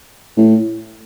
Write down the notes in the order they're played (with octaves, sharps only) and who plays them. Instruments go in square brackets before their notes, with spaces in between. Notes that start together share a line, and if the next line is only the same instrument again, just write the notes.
[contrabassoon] A2